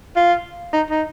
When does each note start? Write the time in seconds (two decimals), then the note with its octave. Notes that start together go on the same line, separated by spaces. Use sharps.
0.16 F4
0.73 D#4
0.90 D#4